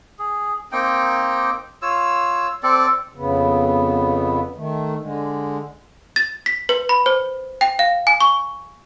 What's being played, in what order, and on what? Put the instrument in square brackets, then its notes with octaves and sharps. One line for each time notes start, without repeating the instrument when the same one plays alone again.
[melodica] G#4
A#3 C4 D#4 G5
F4 C#5 E6
C4 A4 D5
[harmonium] F2 C#3 B3
D#3 A3
D3 G#3
[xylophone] A6
B6
B4
B5
C5
G5
F5
G#5
C#6